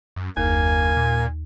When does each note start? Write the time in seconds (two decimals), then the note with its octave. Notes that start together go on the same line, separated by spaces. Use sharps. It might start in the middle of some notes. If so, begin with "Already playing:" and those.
0.16 F#2
0.37 F#1 D#2 A#3 G#5
0.97 A#2